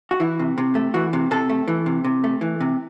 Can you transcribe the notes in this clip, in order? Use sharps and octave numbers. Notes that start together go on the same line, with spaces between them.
F#4
E3 E4
C3
C3
A3
E3 F#4
C3
C3 A4
A3
E3
C3
C3
A3
E3
C3